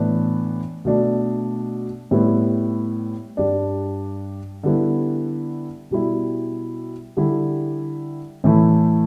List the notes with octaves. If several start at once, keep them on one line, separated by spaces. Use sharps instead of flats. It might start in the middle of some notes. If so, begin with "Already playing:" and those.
Already playing: A2 E3 B3 D4
B2 A3 D4
A2 G3 B3 E4
G2 G3 D4
D3 G3 B3 E4
B2 G3 E4
D3 G3 E4
A2 E3 A3 E4